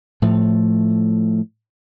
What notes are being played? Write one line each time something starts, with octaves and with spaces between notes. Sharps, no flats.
A2 F3 A3